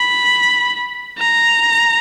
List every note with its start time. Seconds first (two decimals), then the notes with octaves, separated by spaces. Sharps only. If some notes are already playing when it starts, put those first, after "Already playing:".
Already playing: B5
1.18 A#5